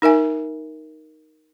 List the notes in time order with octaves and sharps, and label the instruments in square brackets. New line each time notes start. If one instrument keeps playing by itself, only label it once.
[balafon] D#4 A#4 E5 G#5